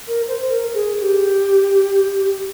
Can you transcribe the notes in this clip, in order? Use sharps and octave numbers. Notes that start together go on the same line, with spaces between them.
A#4
C5
A#4
G#4
G4